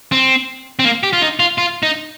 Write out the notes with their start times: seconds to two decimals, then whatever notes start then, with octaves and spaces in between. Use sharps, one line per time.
0.12 C4
0.79 C4
0.85 A#3
1.03 G4
1.13 F4
1.22 D#4
1.40 F4
1.58 F4
1.83 D#4